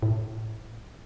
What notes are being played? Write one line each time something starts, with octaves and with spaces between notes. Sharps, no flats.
A2